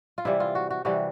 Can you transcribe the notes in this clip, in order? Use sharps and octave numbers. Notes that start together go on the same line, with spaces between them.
F4
C3 E3 G3 E4
F4
F#4
F#4
C3 E3 G3 F#4